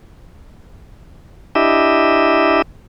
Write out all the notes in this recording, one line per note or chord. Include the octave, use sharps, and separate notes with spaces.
D4 E4 G4 D#5 E5